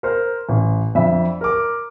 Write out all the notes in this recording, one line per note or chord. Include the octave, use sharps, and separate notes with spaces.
A#4 C5
A1
F2 D4 E5 B5
A#4 D6